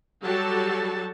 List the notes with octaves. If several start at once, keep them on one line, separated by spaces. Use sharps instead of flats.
F#3 G3 F#4 G4 A4 A5